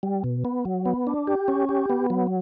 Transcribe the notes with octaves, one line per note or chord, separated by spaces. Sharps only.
G3
B2
B3
F#3
B3
D4
G4
C#4
G4
B3
F#3